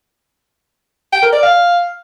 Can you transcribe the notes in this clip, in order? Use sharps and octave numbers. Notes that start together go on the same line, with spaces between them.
G5
A#4
D5
F5